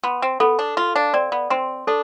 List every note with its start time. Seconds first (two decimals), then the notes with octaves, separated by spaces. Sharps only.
0.04 B3 C6
0.22 C4
0.40 B3 A4
0.59 D4
0.77 F4 F5
0.96 D4
1.14 C4 D5
1.32 B3
1.50 C4 C6
1.87 D4 A4